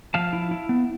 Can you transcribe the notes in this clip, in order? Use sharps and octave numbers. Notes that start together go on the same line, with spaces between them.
F3 F5 A5
E4
E4
B3